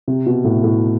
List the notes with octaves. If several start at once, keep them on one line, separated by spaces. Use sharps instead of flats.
C3
B2
A2
A2